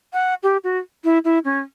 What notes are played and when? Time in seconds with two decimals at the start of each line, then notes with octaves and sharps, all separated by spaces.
0.13 F#5
0.43 G4
0.64 F#4
1.04 E4
1.24 E4
1.45 C#4